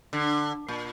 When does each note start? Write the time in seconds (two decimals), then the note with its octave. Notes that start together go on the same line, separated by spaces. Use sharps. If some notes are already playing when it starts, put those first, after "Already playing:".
0.13 D3
0.68 A#2